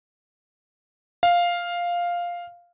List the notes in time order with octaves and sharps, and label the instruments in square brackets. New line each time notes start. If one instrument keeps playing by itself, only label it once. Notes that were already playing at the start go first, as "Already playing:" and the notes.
[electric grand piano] F5